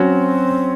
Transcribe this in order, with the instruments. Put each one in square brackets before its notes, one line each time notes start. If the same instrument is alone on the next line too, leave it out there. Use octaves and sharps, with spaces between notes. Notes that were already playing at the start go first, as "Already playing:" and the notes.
Already playing: [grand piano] F#3 C#4 F#4 [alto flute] C4